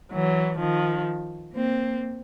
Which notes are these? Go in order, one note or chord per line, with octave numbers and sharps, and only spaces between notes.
E3 F#3
D#3 F3
A#3 C4